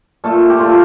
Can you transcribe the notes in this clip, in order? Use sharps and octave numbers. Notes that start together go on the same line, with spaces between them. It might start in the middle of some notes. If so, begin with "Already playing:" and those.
A#2 A3 A4
G4
A#2 A3 F4